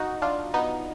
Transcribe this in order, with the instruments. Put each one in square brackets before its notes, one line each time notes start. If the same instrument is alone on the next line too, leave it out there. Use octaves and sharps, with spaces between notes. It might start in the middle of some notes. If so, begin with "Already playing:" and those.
Already playing: [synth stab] D#4 F#4
D4 F4
B3 D#4